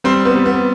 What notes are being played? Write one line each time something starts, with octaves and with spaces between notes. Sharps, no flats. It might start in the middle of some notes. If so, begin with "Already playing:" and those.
G3 C4
B3
G3
B3